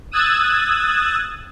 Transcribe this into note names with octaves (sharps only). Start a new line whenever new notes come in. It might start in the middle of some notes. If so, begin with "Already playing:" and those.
D#6 E6 F#6 G#6 A6